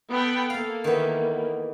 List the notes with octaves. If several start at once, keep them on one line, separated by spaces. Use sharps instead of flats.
B3 A4 G5
A#3 A4 F5
D#3 E3 B3